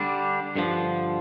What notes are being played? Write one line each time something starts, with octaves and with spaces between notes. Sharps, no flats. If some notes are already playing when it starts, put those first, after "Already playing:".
Already playing: D3 G3 D4
G2 D3 F3